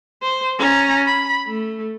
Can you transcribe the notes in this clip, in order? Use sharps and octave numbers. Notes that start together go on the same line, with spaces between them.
C5
C#4 A#5
B5
A3